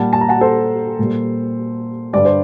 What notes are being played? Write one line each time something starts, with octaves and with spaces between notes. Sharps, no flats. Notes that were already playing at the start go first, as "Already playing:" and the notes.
Already playing: A#2 G3 F#5 A5
A5
A#5
F#5 A5
A4 C5
A#2 G3
G2 D3 G3 D5
C5